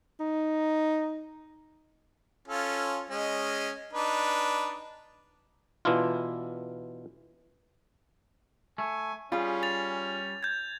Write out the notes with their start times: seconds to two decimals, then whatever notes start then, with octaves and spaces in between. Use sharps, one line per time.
0.20 D#4
2.48 C#4 F4 A4
3.10 G#3 C#4 D#5
3.93 D4 D#4 B4
5.85 B2 E3 D4 E4 F4
8.78 A3 G#5
9.32 G3 C#4 F4 G#4
9.63 A6 F7
10.43 G6 G#6